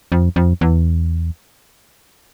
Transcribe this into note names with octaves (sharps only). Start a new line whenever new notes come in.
F2
F2
E2